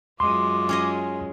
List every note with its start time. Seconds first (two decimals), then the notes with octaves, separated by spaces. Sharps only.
0.20 F#2 G#3 F4 C6 D6
0.69 C#4 G#4 D#5